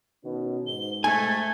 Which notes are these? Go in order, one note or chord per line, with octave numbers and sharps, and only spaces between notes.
B2 D#3 C#4
G#2 G7
A3 G#5 G#6